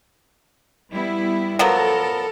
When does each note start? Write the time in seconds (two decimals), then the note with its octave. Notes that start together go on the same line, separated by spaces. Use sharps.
0.92 G3 B3 E4
1.59 F3 F#3 B3 A4 A#4